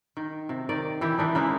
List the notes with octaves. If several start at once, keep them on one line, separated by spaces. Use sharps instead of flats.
D#3
C3
D#3 D5
E3 E4 G4
E3 D4 D#4
C#3 G#3 A#3 E4